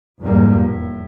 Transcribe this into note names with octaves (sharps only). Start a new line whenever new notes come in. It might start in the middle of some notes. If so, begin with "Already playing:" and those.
F1 E2 G#2 G3 A#3
A2